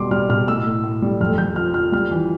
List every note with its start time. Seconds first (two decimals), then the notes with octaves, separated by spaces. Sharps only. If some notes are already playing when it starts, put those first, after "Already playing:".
Already playing: B2 G3 C6 D6
0.11 G3 F6
0.29 B2 F6
0.47 A2 E6
0.66 A2
0.84 A2
1.02 G3
1.21 F2 F6
1.38 F2 G6
1.56 F3 F6
1.74 F3 F6
1.92 G3 F6
2.11 E3